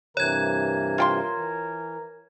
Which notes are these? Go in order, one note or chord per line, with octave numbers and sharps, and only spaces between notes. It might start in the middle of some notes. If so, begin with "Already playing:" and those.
G2 C3 E3 A#4 C#5 G#6
F4 G5 C6
E3